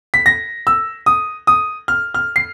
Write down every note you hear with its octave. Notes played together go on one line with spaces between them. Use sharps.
B6
A#6
E6
D#6
D#6
F6
F6
C7